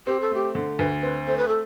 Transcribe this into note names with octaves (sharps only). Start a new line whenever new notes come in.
C4 G4
A4
A3 G4
D3
D2 B4
C4 B4
A3 C5
B4
A4